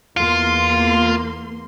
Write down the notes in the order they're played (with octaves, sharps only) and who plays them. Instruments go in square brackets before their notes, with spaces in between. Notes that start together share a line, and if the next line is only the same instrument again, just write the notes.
[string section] E2 A#3 C6 [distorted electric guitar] F4